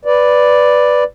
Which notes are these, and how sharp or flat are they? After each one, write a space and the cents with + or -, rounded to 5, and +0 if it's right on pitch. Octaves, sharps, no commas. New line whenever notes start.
B4 +0 D5 +0